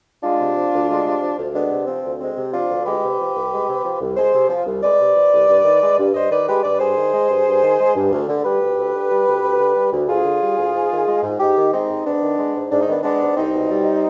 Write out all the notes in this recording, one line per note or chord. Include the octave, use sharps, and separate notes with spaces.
G#3 D4 F4
C3
F3
D2
G#3
C3
F3
D2
G#3 B3 D4
C3
F3 C4
D2
G#3 C4
C3
F3 D4 F4
D2
G#3 G4 B4
C3
F3
C2
G#3
C3
F3
C2
G#3 G#4 C5
C3
F3
C2
G#3 B4 D5
C3
F3
C2
G2
D#3
G#3
G2
G2 C5 D#5
D#3 B4 D5
G#3 G4 B4
G2 B4 D5
G2 G#4 C5
D#3
G#3
G2
G2
D#3
G#3
G2
D2
D3
G3 G4 B4
D2
D2
D3
G3
D2
D2
D3
G3
D2
D2 F4 G#4
D3
G3
D2
G#2
D#3
G#3
G#2
G#2 D#4 G4
D#3
G#3 C4 D#4
G#2
G#2 B3 D4
D#3
G#3
G#2
G#2 D4
D#4
D#3 B3 D4
G#3 B3 D4
G#2
C2 C4 D#4
B2
G3